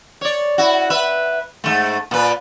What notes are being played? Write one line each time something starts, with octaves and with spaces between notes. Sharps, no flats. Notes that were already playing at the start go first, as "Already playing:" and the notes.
C#5 D5
E4 F#4
B4 E5
G#2 F3 A3
A#2 B4